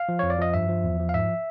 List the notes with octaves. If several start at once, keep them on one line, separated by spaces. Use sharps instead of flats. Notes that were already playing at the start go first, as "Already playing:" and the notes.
Already playing: F5
F3
F2 C#5
D5
F3 D#5
G2 E5
F3
E2
F3
F5
G#2 E5